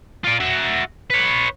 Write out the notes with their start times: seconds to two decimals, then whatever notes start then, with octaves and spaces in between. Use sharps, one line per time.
0.24 F4 D5
0.40 F#4 E5
1.10 B4 C#5